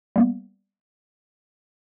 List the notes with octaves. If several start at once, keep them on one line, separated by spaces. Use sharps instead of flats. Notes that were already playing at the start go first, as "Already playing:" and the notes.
G3 A#3 B3